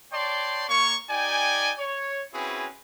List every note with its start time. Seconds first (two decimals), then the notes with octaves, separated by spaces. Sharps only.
0.12 C#5 D5 G5 A5 C6
0.68 A#3 C#5 C#6
1.09 D#4 G4 D5 G5 G#5
1.79 C#5
2.34 C4 C#4 E4 F#4 G#4 B4